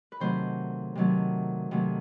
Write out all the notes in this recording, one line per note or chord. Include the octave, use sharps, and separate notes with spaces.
B4
C3 D#3 F#3 A3 C5
C3 D#3 F#3 A3
C3 D#3 F#3 A3